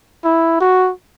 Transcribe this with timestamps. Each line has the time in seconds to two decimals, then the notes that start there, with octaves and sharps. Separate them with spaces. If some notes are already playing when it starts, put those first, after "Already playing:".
0.25 E4
0.60 F#4